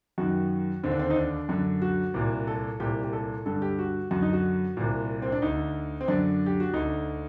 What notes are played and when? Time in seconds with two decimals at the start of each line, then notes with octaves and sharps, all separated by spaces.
0.18 F#2 D#3 F#4
0.84 D#2 D3 C4
0.91 D4
0.99 C4
1.10 D#4
1.16 D4
1.49 F#2 D3
1.82 F#4
2.14 C2 A#2
2.47 A4
2.80 C2 A#2 G4
3.03 G4
3.13 A4
3.46 G2 D3 A4
3.62 G4
3.79 F#4
4.11 F#2 D3 F#4
4.22 D#4
4.33 F#4
4.77 C2 A#2
5.22 C4
5.32 D4
5.42 D2 D3 D#4
6.01 C4
6.08 F#2 D3 D4
6.46 G4
6.60 F#4
6.73 D2 D3 D#4